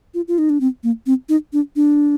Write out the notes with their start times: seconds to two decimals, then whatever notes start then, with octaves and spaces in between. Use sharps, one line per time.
0.14 F4
0.28 F4
0.38 D#4
0.50 D4
0.61 C4
0.83 A#3
1.06 C4
1.29 D#4
1.53 D4
1.76 D4